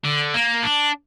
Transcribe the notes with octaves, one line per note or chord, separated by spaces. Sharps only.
D3
A#3
D4